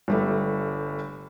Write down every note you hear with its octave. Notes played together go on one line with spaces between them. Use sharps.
G1 G3 A3